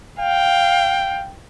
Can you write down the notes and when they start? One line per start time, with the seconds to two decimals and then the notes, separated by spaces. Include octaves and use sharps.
0.19 F5 G5